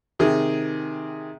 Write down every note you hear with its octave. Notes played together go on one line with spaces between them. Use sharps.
C3 D#3 G#4